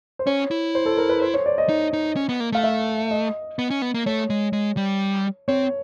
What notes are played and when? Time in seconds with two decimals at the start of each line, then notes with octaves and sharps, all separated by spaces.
0.19 C5
0.26 C#4 C#5
0.51 E4
0.75 C5
0.86 A4
0.98 A#4
1.09 B4
1.22 C5
1.34 C#5
1.46 D5
1.58 D#5
1.69 D#4
1.93 D#4
2.16 C#4
2.29 B3
2.40 A#3
2.52 A3 F5
2.63 E5
3.11 D#5
3.59 B3
3.70 C#4
3.82 B3
3.94 A#3
4.06 A3 C#5
4.30 G#3
4.53 G#3
4.77 G3
5.48 C4 C#5